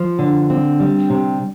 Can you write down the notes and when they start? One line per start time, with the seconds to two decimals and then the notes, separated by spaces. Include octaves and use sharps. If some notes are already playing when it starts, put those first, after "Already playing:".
Already playing: F3
0.19 D3
0.50 C4
0.80 G3
1.10 C3